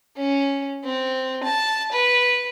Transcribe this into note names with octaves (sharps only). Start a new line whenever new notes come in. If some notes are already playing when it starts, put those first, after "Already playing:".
C#4
C4
A5
B4